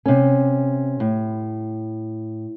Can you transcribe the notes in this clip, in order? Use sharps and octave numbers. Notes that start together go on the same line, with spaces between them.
C3 C#4
A2